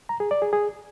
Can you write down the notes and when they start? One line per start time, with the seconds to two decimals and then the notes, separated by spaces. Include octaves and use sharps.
0.09 A#5
0.20 G#4
0.31 D5
0.42 G#4
0.53 G#4